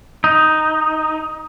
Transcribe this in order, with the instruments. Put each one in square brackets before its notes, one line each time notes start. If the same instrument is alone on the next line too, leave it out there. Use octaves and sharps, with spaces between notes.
[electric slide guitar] D#4